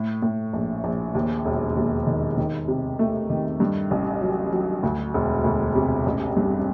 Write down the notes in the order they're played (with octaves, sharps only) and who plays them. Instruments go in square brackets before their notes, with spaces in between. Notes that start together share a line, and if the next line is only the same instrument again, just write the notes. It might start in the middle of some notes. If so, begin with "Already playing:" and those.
Already playing: [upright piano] A2
A2
A#1
A#1
D#2
E1
D#2
D#3
D#3
C3
A3
D#3
G2
A1
F#3
F#3
D2
E1
D2
C3
A1
G2